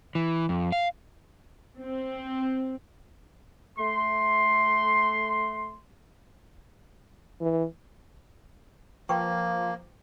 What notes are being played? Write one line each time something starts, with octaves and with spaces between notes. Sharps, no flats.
E3
F2
F5
C4
A3 C6
E3
F3 A#3 B4 G5 C#6